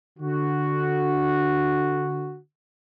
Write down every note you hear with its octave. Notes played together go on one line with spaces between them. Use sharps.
D3 F#4